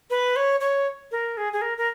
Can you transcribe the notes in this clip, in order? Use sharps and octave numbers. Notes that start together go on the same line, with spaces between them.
B4
C#5
C#5
A#4
G#4
G#4
A#4
A#4